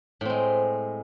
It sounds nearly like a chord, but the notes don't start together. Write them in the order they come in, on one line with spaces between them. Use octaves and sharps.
A2 C4 G#3